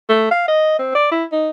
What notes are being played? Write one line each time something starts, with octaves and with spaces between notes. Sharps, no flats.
A3
F5
D#5
C4
D5
E4
D#4